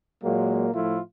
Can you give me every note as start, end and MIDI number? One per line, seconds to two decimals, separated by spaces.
0.24 0.69 46
0.24 0.69 54
0.24 0.69 56
0.24 0.69 58
0.75 0.99 45
0.75 0.99 53
0.75 0.99 57
0.75 0.99 64
0.75 0.99 65